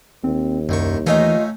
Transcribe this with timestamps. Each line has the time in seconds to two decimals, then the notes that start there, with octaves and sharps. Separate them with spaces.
0.24 D#2 C4
0.69 C2 F#2 D#3 C#6
1.06 E3 A3 C#4 D#4 F4 D#5 A#5